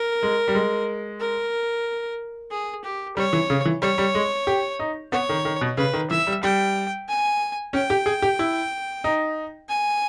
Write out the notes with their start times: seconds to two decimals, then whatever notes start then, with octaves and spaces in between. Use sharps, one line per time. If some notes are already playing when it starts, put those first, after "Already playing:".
Already playing: A#4
0.23 G#3
0.48 G3
0.55 G#3
1.20 A#4
2.51 G#4
2.84 G4
3.17 G3 C#5
3.33 E3
3.50 C#3
3.65 E3
3.82 G3 C#5
3.98 G3
4.15 G#3
4.47 G4
4.79 D#4
5.12 B3 C#5
5.29 D#3
5.45 D#3
5.61 B2
5.77 C#3 B4
5.93 D#3
6.10 E3 E5
6.27 G3
6.43 G3 G5
7.08 G#5
7.73 C#4 G5
7.90 G4
8.06 G#4
8.22 G4
8.39 E4
9.04 D#4
9.69 G#5